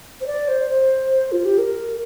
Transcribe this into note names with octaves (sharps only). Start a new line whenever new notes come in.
C5
D5
C5
C5
F4
G4
A#4